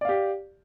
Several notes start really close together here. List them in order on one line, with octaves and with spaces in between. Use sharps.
D5 F5 G4